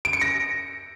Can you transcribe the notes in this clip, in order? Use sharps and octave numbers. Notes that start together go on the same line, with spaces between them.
D7
C#7
A#6